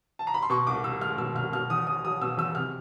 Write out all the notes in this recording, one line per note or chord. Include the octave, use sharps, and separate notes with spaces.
A5
A#5
B5
C6
B2 C#6
C2 D6
C2 E6
G#3 F6
B2 E6
C2 F6
B2 F6
E2 D#6
E2 D#6
F#3 D#6
B2 E6
E2 E6
C3 F6